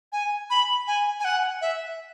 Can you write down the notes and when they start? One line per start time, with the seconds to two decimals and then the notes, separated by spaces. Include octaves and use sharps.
0.12 G#5
0.50 B5
0.87 G#5
1.20 G#5
1.25 F#5
1.61 E5